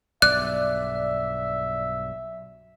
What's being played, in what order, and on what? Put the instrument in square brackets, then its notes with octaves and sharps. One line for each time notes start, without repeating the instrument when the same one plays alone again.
[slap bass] B1 G2 [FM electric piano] D5 [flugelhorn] E5 [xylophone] F#6